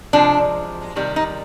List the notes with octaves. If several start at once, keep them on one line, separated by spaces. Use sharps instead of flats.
C3 F3 G#3 D4
C3 D#3 G3
D#4